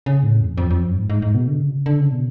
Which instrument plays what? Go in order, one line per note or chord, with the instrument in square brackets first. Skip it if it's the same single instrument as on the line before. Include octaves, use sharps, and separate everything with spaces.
[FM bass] C#3
A2
F2
F2
F2
F#2
G#2
G#2
G#2
B2
D3
C#3
D3
C#3
B2